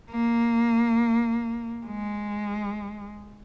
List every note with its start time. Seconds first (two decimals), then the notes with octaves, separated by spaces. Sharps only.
0.10 A#3
1.86 G#3